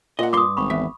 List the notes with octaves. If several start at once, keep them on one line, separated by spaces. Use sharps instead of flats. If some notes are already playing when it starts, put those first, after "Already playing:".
A#2 D#5 F#5
G2 C6 D6 D#6
G#1 B5 C#6
E2 E5